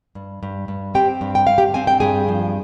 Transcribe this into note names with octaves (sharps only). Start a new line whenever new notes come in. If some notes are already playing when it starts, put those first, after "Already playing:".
G2
G2
G2
C4 G4 G5
G2
G5
G2 F5
G4 G5
C4 G#5
G5
G2 G#4 G#5
F3